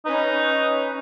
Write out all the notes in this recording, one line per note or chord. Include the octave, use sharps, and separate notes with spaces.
C#4 D#4 B4